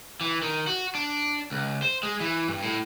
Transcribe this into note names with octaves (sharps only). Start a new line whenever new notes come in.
E3
D#3
F#4
D4
C#2
C5
G#3
E3
G2
A2